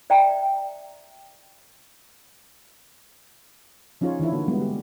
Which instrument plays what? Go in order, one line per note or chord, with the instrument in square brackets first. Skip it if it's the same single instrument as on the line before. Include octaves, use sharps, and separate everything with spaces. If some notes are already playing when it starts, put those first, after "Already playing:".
[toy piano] D5 E5 G5 A#5
[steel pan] F3 C#4 D#4 F4 G#4 C#5
D#3 E3 D4 E4
D3 A#3 F#4
G3 G#3 B3
G4